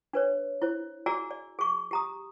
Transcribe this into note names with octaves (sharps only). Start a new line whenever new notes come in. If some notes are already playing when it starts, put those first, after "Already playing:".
D4 B4 C#5
E4 C5
F#4 G#4 D5 G#5 A#5 E6
D5
G#4 C#6
G4 A#5 D#6